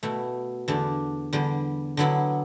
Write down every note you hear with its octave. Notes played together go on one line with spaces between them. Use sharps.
B2 A3 E4
E2 D3 A3 D4
E2 D3 G3
D3 F#3 B3 E4